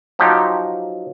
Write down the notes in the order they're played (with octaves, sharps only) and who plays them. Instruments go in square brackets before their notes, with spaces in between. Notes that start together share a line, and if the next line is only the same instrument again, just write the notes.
[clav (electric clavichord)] F3 F#3 D#4 G4